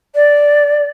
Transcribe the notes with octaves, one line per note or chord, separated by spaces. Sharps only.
D5